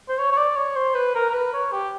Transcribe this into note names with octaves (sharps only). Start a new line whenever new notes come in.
C5
C#5
C#5
D5
C#5
C5
B4
A#4
A#4
B4
C#5
G4